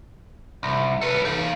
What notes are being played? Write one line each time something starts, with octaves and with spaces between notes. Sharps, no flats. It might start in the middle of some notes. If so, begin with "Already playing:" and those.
C2
A4 B4
D#4 F5